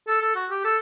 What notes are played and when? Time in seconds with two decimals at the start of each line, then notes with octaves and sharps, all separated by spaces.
0.07 A4
0.21 A4
0.35 F#4
0.50 G4
0.64 A4